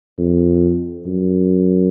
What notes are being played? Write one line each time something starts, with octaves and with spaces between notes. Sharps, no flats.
F2
F#2